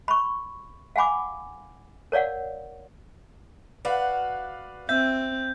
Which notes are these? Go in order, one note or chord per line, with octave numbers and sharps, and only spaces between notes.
B5 C#6
F5 F#5 G#5 B5 D6
A#4 C#5 D5 F5 F#5
F#4 B4 D5 F5
C4 E5 G6